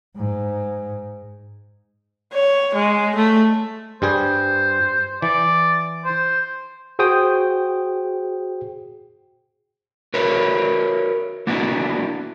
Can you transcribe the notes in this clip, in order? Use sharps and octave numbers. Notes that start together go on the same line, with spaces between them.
G#2
C#5
G#3
A3
G2 G3 G#4 C5
E3 D5
C5
F#4 G#4 C5 G5 D#6
F#4 A#4 B4 C#5
A#3 B3 D4 E4 F#4